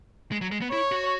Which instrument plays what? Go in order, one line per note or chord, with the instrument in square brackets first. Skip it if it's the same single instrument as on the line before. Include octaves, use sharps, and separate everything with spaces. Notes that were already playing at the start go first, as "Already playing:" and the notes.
[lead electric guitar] G#3
F#3
G#3
B3
[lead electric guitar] E4 [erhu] C#5
[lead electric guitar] F#4